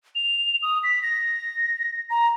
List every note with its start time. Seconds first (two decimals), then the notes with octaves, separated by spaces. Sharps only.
0.15 F7
0.63 D#6
0.84 B6
1.03 A#6
2.10 A#5